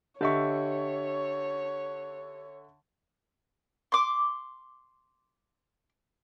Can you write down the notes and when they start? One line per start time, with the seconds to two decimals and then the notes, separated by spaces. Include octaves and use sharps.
0.21 D3 G4 C#5 D#5 E5 C#6
3.92 C6 D6